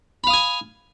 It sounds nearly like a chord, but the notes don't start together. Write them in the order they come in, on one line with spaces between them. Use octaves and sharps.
B5 F5 D#6 G#5